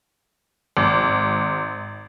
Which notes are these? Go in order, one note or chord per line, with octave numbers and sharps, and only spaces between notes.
G#1